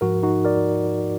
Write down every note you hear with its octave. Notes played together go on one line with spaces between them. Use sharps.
G#2 F3 F#4 A#4
D#4 F#4
A#4 D5